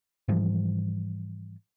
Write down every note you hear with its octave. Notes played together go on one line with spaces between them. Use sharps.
G#2 E3 F3 G3